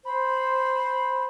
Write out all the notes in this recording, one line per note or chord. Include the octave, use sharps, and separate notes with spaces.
C5 B5